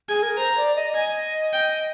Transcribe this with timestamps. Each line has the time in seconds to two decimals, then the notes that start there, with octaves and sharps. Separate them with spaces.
0.09 G#4 G#5
0.23 A#4
0.37 C5 A#5
0.57 D5
0.76 D#5
0.95 D#5 G#5
1.53 G5